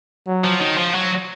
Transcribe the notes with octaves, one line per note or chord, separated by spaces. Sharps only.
F#3
F3
D#3
F3
F#3